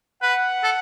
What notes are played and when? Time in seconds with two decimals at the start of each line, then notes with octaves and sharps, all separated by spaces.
0.22 B4 F#5
0.64 A4